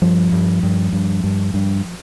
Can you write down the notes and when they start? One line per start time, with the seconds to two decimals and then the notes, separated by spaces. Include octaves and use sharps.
0.02 G2 F3
0.32 G2
0.63 G2
0.93 G2
1.24 G2
1.54 G2